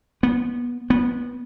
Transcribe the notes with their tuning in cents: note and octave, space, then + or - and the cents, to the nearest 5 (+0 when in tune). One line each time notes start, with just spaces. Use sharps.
B3 -25
B3 -20